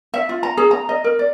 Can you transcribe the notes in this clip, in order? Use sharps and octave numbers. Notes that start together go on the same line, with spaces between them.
E5
F4
A#5
G#4
A#5
D#5
A#4
D5